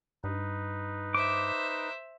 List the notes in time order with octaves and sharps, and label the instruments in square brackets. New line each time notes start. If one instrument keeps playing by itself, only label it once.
[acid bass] G2 [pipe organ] D#4 B4
[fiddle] C5 E5 [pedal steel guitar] D6